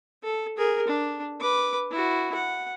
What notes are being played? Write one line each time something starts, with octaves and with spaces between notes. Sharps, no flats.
A4
G#4 A#4
D4
B4 D6
E4 F#4
F#5